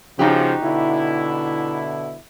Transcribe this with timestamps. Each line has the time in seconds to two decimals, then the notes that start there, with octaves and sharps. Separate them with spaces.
0.19 C#3 F3 D#4 F#4 G4
0.64 B2 D3 E4